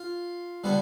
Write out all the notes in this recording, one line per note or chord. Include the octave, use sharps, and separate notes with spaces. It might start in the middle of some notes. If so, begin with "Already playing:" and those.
Already playing: F4
D3 G3 B3